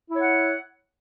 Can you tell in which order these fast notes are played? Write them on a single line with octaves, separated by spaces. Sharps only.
E4 C#5 F#5